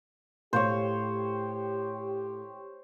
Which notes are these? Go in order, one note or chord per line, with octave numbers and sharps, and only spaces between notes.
A2 G4 C5 C#5 F5